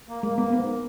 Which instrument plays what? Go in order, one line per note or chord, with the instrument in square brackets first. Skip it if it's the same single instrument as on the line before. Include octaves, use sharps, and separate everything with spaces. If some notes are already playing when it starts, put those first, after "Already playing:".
[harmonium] A#3
[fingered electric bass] G#3 [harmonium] A#3
[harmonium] A#3 [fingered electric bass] B3
[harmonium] G#2 [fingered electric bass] B3